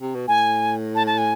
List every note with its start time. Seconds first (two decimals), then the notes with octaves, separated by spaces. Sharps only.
0.01 C3
0.15 B2
0.28 A2 G#5
0.95 A5
1.07 A5
1.18 G#5